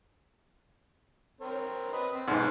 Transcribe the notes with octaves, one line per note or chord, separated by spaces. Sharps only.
C4 A#4 C#5
B4 D#5
C4
B1 G#2 C5 F5